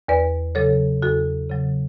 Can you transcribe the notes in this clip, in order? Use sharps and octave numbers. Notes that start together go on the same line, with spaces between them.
E2 B4 D5
C#3 F#3 A4 C#5
E2 F#4 A4
C#3 F#3